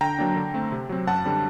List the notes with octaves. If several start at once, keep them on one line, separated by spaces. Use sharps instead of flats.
D3 G5 A#5
F#3 A#3 D4
D3
A3 C4
C3
F#3 C4
F#2 F#5 A5
D3 G3 C4